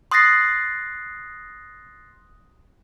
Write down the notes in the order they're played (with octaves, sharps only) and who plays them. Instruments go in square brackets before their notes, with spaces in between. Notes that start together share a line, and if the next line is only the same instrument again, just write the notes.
[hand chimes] C6 D#6 F#6 A6 A#6 C7